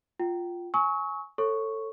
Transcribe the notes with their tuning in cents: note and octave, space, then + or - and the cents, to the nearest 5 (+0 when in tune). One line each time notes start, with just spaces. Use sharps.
F4 +0 G5 -25
G#5 +15 C#6 +0 E6 -45
A4 +15 C#5 -20 C#6 +0